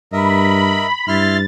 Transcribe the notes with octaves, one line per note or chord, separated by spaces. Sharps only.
G2 A#4 D#5 E5 B5
G2 E4 C6 F6 A6